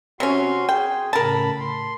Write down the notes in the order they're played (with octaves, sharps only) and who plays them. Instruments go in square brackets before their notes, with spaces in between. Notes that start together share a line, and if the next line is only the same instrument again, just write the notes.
[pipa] C3 C#4 [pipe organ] F#4 C6
[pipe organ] G#4 [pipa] G5
[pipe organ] A2 C#3 B5 [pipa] A#4 A5
[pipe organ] C6